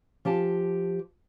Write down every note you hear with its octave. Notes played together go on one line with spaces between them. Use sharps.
F3 G4 G#5 A5